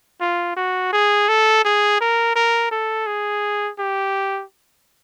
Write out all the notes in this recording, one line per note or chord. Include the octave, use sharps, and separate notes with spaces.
F4
F#4
G#4
A4
G#4
A#4
A#4
A4
G#4
G4